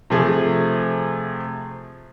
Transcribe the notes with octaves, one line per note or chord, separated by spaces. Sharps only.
C3 F3 A3 G#4